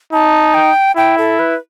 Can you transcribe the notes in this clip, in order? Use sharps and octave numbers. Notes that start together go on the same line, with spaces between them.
D#4 A5
G5
E4 G5
A4
B4